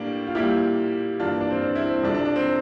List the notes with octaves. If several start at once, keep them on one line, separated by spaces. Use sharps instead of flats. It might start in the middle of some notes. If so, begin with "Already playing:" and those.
Already playing: A2 G3 A#3 D4
F4
A#2 G3 A#3 E4 G4
G2 E3 A#3 D4 F4
D4
C4
D4
C4 E4
C4
F2 C3 F3 D4
D4
D4
C4